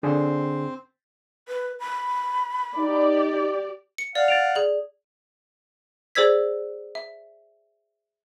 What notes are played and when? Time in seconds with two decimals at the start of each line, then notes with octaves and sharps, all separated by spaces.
0.03 D3 C4 D4 G#4 C5
1.49 B4
1.80 B5
2.77 D#4 G4 D5
3.98 C#7
4.15 D5 F5 F#5
4.28 A6 D7 F7
4.55 G#4 D5 F#7
6.15 G#4 C5 D5 E6 G#6 B6
6.95 E5